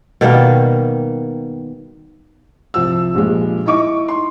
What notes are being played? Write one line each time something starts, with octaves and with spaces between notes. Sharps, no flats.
B2 D#3 G3 A#3
C2 F3 E6
G2 A#2 F3 G#3
D#4 E4 D#5 C#6 D6
C6